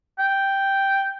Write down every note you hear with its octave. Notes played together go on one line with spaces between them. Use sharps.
G5